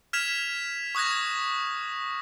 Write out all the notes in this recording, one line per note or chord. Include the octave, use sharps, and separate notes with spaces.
F6 G#6 B6 E7 F7
C#6 D#6 F#6 G#6 A#6